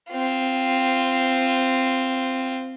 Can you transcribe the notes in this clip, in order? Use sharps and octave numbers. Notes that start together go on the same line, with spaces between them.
C4 F4